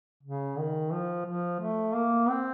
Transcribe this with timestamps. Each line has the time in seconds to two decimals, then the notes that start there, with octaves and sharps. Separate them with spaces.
0.23 C#3
0.58 D#3
0.92 F3
1.26 F3
1.60 A3
1.95 A#3
2.29 C4